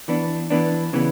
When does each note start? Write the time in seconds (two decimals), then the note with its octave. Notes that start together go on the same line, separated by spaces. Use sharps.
0.08 E3 B3 D4
0.50 E3 B3 D4
0.93 C#3 E3 B3